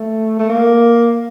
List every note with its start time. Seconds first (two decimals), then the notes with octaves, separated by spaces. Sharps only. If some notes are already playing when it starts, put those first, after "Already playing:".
Already playing: A3
0.40 A3
0.50 A#3